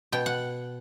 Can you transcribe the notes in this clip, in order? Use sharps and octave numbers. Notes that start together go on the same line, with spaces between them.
B2 G5
F#5